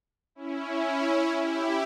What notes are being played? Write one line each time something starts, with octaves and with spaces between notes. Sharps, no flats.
C#4 E4
E4 G4